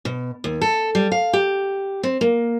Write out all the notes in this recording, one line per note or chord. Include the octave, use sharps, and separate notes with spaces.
B2
D#2
A4
G3
F5
G4
C4
A#3